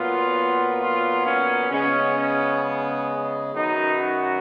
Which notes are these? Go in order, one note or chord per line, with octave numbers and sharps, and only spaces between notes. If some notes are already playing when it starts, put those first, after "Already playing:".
Already playing: A#2 F#3 B3 F4
F4
C#4
C#3 G#3 B3 C#4
C#4
F#2 D#3 F#3 B3 D#4
F#4